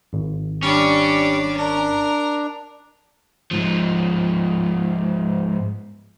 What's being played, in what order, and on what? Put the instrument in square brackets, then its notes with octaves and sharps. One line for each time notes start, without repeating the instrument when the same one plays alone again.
[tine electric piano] G#1
[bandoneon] G3 [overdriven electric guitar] C#4 [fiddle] D4 D5
[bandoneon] D4 [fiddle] A#4
[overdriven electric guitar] G#2 F3